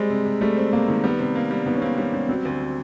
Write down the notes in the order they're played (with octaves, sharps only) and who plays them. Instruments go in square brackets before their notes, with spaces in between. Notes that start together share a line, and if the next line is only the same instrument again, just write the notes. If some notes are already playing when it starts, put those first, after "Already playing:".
Already playing: [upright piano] G3 C4 [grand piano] G#3
[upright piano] C3
C3
[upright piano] G3 [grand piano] A3
[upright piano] C4
[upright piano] C3 [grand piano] A#3
[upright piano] D#3
[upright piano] G3 [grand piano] B3
[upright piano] C3
A#3
G3
[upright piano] D#3 [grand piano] B3
[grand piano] C#4
[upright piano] A#3 [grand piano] C4
[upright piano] G3 [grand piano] C#4
[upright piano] G3 [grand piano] C#4
[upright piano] F#3 [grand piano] C4
[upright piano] D2